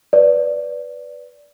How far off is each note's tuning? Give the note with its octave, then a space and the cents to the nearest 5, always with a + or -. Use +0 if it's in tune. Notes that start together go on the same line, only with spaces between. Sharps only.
B4 +0 D5 -10